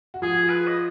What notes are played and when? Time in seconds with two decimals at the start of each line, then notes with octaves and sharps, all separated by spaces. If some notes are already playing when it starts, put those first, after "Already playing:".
0.14 F#4
0.22 F3 F4 G#4
0.49 B4
0.68 D#5